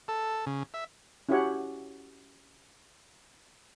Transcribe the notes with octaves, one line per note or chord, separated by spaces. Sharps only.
A4
C#3
E5
C#4 E4 F#4 G4 C#5 F#5